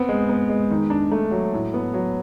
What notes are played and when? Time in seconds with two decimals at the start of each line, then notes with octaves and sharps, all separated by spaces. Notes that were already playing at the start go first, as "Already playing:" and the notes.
Already playing: B3 C4
0.09 G#3
0.29 B3
0.49 G#3
0.71 D#3
0.90 D4
1.11 A3
1.31 F#3
1.53 A2
1.74 B3
1.94 F#3